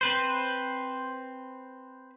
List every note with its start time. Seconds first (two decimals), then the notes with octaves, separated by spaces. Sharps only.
0.01 C4 B4 C5